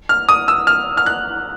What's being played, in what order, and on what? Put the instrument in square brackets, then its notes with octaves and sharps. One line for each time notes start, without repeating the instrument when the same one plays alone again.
[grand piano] F6
D#6
E6
F6
F6
F#6